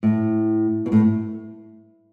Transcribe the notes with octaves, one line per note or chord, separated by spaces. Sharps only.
A2
B2
A2